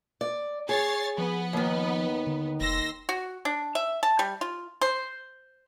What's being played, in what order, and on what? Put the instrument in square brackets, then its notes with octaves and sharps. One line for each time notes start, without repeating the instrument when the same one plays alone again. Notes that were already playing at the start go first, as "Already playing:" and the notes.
[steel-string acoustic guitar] D5
[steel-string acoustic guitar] G#4 [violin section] C#5 A6 C7
[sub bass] F3 [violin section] B3
[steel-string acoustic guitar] D#2 D#3
[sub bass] D3
[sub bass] F1 [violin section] C6 E6 A#6
[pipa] F#4
D4
E5
A5
G3
F4
C5